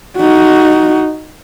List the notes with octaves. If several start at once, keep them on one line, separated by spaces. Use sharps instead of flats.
D#4 F#4